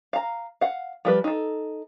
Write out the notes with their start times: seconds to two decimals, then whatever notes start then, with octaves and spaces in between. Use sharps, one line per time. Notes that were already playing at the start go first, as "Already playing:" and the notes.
0.13 F5 A#5
0.61 F5 F#5
1.05 F3 G3 B4
1.24 D#4 A4